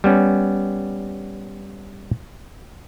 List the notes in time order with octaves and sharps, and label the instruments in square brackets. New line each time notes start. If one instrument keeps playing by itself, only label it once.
[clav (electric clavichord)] G3 B3 C#4